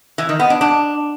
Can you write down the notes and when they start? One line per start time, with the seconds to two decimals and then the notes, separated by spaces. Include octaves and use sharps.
0.18 E3
0.29 D#3
0.40 B3
0.50 D4
0.61 D4